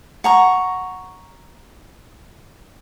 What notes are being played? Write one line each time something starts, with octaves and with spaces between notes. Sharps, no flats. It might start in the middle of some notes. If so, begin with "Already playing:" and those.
F#5 A#5 C#6